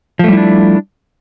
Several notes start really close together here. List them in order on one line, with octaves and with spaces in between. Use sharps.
F3 A3 G3 E4 D4